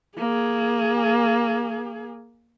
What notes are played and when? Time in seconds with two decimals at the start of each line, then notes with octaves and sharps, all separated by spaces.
0.17 A#3 G#4